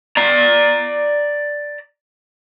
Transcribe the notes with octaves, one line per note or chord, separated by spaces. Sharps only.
D5 A#5